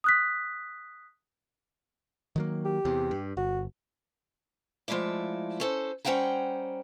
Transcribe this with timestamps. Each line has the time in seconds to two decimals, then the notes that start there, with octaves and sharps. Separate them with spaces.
0.04 D#6 F#6 B6
2.36 D#3 F#3 A#3
2.65 G4
2.85 E2 C3
3.11 G2
3.37 G1 F#4
4.88 F3 G#3 A3 E4 D5
5.60 C#4 A4 C5
6.05 G3 C#4 C5 F#5 G5 A#5